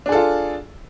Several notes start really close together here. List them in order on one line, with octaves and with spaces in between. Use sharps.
D4 G#4 A4 F4